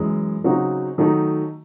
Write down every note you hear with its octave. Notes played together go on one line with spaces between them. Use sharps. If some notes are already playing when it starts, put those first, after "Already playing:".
Already playing: F#2 E3 G#3
C#3 F#3 C4 D#4 F#4
D#3 F#3 A3 D#4